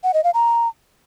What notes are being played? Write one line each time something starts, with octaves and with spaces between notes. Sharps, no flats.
F#5
D#5
F5
A#5